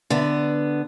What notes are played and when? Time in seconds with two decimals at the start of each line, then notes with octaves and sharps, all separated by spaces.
0.10 D3 B3